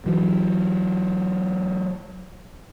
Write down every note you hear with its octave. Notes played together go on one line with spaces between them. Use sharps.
E3 F#3